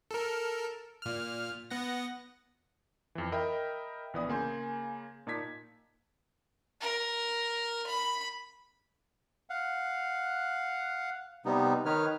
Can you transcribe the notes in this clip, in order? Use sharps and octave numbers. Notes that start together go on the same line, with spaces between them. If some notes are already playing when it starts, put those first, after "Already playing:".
A4 A#4
A#2 F6
B3 F#5 A#6
F2 E3
A#4 D#5 E5 G5 B5
A#1 E3 B3 D5 D#6
C#3 A#3 G#5 C6 G6
A#2 D#4 A5 G#6 B6
A#4
B5
F5 F#5
C3 G3 B3 D#4
D#3 D#4 B4 C#5 F6